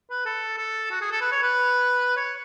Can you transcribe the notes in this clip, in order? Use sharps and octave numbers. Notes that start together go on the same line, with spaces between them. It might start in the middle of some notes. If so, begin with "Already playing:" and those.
B4
A4
A4
F#4
G#4
A4
B4
C#5
B4
C#5